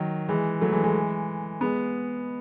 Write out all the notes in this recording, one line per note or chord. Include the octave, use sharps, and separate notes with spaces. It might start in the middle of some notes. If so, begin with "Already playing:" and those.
Already playing: D#3 F#3
E3 G#3
F#3 A3
E3 G#3
E3 G#3
G#3 B3